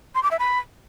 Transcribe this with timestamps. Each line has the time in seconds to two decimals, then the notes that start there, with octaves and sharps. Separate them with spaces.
0.15 C6
0.23 D6
0.31 E5
0.39 B5